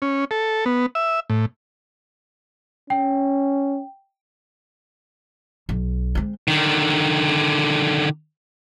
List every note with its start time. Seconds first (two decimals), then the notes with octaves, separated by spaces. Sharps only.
0.02 C#4
0.31 A4
0.65 B3
0.95 E5
1.30 A2
2.90 C#4 G5
5.69 B1
6.15 G#3 C4
6.48 D3 D#3